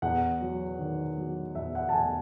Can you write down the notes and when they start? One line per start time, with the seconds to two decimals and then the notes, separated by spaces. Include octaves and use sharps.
0.02 E2 F#5
0.41 F#3
0.79 D#3
1.17 F#3
1.55 E2 E5
1.75 F#5
1.89 A5
1.93 E2 G#5